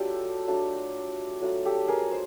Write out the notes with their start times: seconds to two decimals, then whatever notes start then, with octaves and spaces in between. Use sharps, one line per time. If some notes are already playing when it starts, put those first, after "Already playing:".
Already playing: F#3 A3 D4 F4 G4 A4
0.47 F#3 A3 D4 F4
1.41 F#3 A3 D4 F4
1.65 G4 A4
1.88 G#4 A#4
2.11 C5